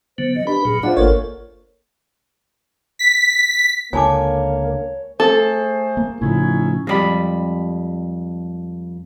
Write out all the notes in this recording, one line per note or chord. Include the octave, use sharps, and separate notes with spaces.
D3 F#3 B3 C5
D#5
D4 G4 B4 B5
A#2 F#3 G#4
D4 F4 C5 E5 F#5
G#1 A#3 A4 A#4 C#5
B6
C#2 D3 A#3 C#5 G#5 A5 D6
A3 G#4 A4 C5
A#3
A2 C#3 F3 C#4 D#4 E4
F2 G3 G#3 G#4 B5